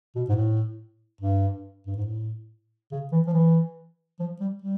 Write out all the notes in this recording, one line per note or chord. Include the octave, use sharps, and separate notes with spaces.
B2
G#2
A2
G2
G2
G#2
A2
C#3
E3
F3
E3
F3
G3
G3